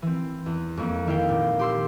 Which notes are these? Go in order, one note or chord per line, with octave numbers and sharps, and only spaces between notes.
E3 C4
E2
F2 G#3 A#3
D#3 E4 F5 G5
A#2
G4 C6 E6